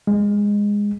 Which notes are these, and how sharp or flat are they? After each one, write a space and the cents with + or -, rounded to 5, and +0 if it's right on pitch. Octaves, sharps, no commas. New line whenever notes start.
G#3 -15